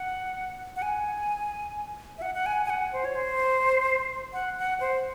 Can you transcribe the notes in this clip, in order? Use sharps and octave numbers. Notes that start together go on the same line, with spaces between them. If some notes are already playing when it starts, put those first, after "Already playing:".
Already playing: F#5
F#5
G#5
E5
F#5
F#5
G#5
G#5
F#5
C5
C#5
C5
F#5
F#5
C5